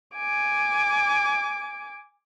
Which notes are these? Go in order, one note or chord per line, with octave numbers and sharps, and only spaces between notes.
G#5 D6